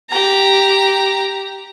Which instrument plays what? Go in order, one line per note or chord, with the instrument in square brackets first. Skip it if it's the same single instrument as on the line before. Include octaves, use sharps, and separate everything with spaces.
[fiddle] G4 A#5